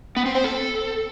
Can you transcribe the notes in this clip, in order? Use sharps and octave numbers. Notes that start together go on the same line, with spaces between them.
B3
C4
C5
A4